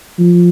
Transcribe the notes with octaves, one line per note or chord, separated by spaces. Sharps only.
F3